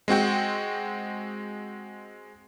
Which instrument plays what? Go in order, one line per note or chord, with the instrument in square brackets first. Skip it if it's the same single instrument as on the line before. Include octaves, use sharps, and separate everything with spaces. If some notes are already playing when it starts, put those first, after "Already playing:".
[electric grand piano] G#3 C4 F#4 G5